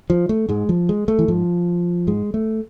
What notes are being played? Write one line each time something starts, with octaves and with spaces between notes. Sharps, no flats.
F3
A3
G#2 G#3
F3
G#3
A3
E3
G#2 F3
G#2 G#3
A3